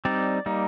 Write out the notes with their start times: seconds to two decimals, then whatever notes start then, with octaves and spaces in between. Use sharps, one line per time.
0.05 G3 C4 D#4 D5
0.46 G3 A#3 D#4